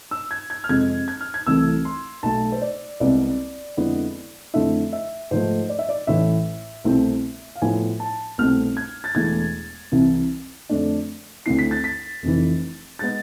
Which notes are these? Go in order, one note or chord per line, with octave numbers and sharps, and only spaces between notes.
E6
G#6
G#6
F6
F2 C3 G#3 G#6
G#6
F6
G#6
C2 C3 E3 A3 E6
C6
B1 B2 A3 A5
C5
D5
C2 C3 G#3 B3 D5
F2 D3 G#3 B3 E4
F2 D3 A3 E4 E5
E5
G#2 F3 A3 C5
D5
E5
D5
A1 A2 E3 E5
C2 B2 A3 C4 E4
F5
A2 F3 B3 E4 G#5
A5
C2 B2 A3 C4 F6
G#6
A6
E1 E2 B2 A3 E4 G#6
C2 C3 E3
F2 D3 A3 D4
D2 D3 A3 C4 E4 C7
B6
A6
B6
F1 F2 E3
G#3 B3 A6